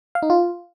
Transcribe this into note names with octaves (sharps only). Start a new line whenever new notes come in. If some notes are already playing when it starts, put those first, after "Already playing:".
F5
D#4
F4